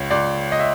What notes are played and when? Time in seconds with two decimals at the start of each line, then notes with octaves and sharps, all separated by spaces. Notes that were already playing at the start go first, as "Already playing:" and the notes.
Already playing: C#2 C#5
0.10 C#2 D5
0.52 D#5
0.60 E5